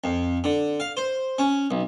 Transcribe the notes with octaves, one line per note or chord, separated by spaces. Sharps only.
F2
D3
F5
C5
C#4
B1